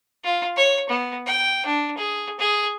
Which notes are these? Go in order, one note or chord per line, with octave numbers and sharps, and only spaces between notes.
F4
C#5
B3
G5
D4
G#4
G#4